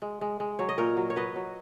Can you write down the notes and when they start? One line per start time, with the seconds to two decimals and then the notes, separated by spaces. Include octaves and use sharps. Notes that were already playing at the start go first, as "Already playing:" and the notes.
0.02 G#3
0.21 G#3
0.40 G#3
0.59 F#3 C#5
0.69 D#5
0.78 A#2 A#4 C#5
0.97 F#3
1.10 C#5
1.16 F#3 B4 D#5
1.36 F#3